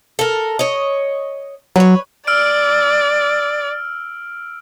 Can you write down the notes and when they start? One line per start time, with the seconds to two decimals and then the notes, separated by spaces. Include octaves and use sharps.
0.19 A4 A#4
0.59 C#5 D#5
1.76 F#3 B4 C#5
2.27 D5 E6 F6 D7